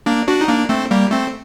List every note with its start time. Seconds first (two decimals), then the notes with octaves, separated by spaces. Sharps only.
0.06 A#3 D4
0.28 D4 F#4
0.41 D#4
0.48 A#3 D4
0.69 A3 C4
0.91 G3 A#3
1.11 A3 C4